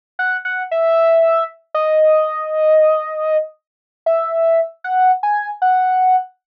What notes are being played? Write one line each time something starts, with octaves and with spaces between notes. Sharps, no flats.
F#5
F#5
E5
D#5
E5
F#5
G#5
F#5